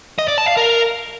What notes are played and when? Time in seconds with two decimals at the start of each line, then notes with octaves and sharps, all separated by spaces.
0.19 D#5
0.28 D5
0.38 A5
0.48 F5
0.57 A#4